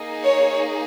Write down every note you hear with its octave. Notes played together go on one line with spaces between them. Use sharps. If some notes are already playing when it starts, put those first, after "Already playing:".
Already playing: A#3 D#4 G#4
C#5